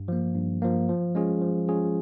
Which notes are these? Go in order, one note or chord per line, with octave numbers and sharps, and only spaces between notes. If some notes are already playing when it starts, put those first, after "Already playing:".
Already playing: G2
F3 A#3
G2
F3 A#3
F3
G#3 C#4 F4 G#4
F3
G#3 C#4 F4 G#4